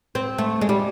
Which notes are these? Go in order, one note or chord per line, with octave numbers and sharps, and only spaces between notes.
C4
A3
G#3
G3